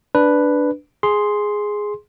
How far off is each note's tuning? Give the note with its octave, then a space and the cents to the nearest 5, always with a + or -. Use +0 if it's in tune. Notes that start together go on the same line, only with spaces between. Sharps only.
D4 +0 B4 +0
G#4 +0 C6 +0